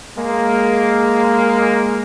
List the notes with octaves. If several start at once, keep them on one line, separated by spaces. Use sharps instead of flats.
G#3 A#3